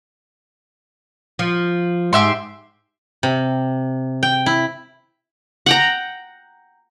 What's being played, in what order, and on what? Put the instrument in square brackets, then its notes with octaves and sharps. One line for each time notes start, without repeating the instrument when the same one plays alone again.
[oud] F3
[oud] G#2 [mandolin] G4 E5 C6
[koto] C3
G5
E4
[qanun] F#5 G5 A#5